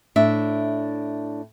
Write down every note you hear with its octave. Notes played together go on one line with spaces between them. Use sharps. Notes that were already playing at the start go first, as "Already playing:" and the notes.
A2 D4 E5